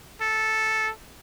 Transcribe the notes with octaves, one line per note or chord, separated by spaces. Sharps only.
A4